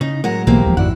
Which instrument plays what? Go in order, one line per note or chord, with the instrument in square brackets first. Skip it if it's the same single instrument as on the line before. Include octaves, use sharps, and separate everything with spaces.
[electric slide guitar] C#3 [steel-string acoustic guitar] D#4
[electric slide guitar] A2 F#3 G#3 [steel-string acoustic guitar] A#4 F#5
[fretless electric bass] B1 B2 E3 [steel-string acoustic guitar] A#3 C4 G4
[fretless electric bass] D#1 F3
[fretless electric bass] G#1 F2 D#3 [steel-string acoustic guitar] E4 [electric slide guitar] F#4 D5 F#5